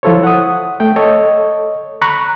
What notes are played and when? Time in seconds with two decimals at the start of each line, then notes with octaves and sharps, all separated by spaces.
0.03 F3 E4 F4 A4 C5 C#5
0.23 F#5 D#6
0.80 A3 G5
0.96 A4 C#5 D#5
2.02 A#5 B5 C#6 F#6